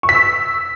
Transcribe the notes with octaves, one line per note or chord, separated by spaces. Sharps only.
C#6
B6
E6